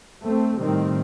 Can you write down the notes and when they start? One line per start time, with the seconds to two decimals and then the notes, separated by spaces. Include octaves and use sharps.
0.21 A3 C4
0.59 A2 D#3 G3 C4